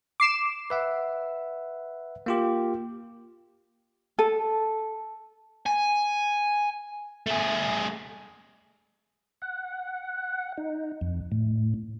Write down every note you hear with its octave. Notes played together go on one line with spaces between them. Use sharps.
D6 C7 E7
B4 E5 F#5
A#3 F4 G4
A4
G#5
A3 G#4
F#5
D#4
F2
A2